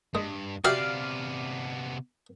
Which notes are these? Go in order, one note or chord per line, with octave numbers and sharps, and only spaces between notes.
G2 G#3
C3 B3 F#4 G4 D5 E5 F5